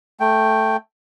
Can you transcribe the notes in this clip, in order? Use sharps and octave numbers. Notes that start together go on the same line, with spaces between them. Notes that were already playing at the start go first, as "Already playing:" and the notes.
A3 G5